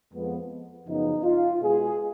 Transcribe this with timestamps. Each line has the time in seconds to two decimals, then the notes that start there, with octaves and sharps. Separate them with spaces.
0.12 F2 F3 G#3 B3
0.86 F#2 C#3 F3 B3 D#4
1.23 F4
1.61 B2 G#3 B3 G#4